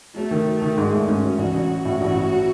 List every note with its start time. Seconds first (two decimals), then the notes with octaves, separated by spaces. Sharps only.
0.16 F#3 A3
0.31 D#3
0.46 F#3
0.62 D#3
0.77 G#2 G#3
0.93 A3
1.08 G#2 C#4
1.24 F#3
1.38 A1 F#4
1.54 A1
1.69 F#3
1.85 A2
2.01 A1
2.15 A2
2.31 F#3